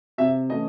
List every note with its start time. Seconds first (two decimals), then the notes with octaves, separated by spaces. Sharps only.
0.18 C3 E5
0.49 E3 A3 C#4 D#5